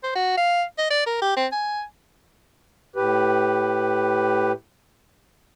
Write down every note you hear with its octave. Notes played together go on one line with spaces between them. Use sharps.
C5
F#4
F5
D#5
D5
A#4
G4
C4
G#5
A2 G4 B4